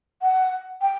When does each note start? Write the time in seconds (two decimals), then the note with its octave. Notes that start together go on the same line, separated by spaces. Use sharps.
0.22 F#5
0.82 G5